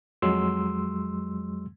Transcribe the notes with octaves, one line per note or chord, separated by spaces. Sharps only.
F2 F#3 G#3 C6 E6